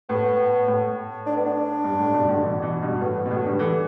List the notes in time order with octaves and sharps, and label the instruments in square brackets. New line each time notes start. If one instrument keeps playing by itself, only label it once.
[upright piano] A2 [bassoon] B3
[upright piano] A2
[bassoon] D4
B3
D4
[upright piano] G2
A2
G2 B2
A2 D3
B2 E3
B2 E3
G2 B2
[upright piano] A2 [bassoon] B3
[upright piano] B2
A2
D3 G3
E3 A3